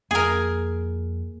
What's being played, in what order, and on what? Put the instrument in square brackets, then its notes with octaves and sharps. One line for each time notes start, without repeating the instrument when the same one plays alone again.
[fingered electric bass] F2 A#3 [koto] G#4 A#4